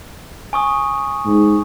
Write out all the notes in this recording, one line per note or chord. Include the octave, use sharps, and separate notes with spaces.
G#5 C#6 D#6
G#2